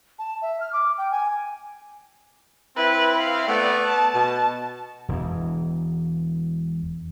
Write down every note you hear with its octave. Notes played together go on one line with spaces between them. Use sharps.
A5
E5
F6
D6
G5
G#5
C4 E4 B4
F5
A3 B3 D5
A5
B2 A5
E1 E2